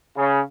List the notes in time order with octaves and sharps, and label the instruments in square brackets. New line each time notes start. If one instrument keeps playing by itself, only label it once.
[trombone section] C#3